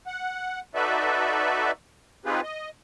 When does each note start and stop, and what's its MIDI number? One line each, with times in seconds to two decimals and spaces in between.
0.07 0.60 78
0.75 1.71 63
0.75 1.71 66
0.75 1.71 69
0.75 1.71 71
0.75 1.71 74
0.75 1.71 76
2.25 2.41 60
2.25 2.41 63
2.25 2.41 65
2.25 2.41 67
2.25 2.41 68
2.25 2.41 71
2.43 2.69 75